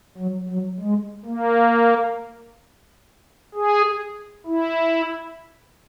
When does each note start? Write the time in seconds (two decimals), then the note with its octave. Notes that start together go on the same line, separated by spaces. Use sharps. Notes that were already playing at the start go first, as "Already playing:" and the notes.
0.18 F#3
0.49 F#3
0.80 G#3
1.25 A#3
3.55 G#4
4.46 E4